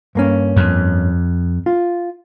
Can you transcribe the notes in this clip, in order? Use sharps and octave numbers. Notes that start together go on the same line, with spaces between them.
G2 A#3 C#4
F2
F4